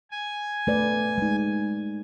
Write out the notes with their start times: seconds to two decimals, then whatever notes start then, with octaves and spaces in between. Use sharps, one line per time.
0.11 G#5
0.67 A3 B4 D5
1.18 G#3 D#4